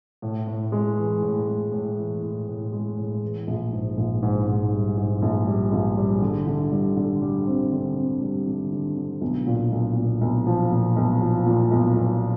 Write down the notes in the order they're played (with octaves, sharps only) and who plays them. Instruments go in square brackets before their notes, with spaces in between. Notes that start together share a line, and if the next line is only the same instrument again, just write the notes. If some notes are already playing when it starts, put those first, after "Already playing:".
[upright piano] A2
A2
G#3
E3
A2
G#3
A2
E3
A2
A2
G#3
A2
E3
A#1
G#2
A#1
G#2
G#2
G3
G#2
A#1
G3
A#1
G3
D3
D3
G3
D3
G3
C4
D3
C4
G3
D3
D3
D3
B1
A#2
B1
A#2
B1
F3
A#2
B1
F3
A#2
B1
B1